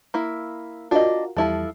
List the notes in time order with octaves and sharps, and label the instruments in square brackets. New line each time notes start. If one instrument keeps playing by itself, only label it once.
[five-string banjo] A#3 E4
[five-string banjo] D4 D#5 [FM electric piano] F4 F#4 A#4
[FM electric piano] E2 G3 [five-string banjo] F3 E4 A4